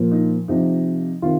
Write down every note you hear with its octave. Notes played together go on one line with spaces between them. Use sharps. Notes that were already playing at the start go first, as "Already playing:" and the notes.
Already playing: A#2 F3
D#4
C3 F3 D#4
C3 D#3 F4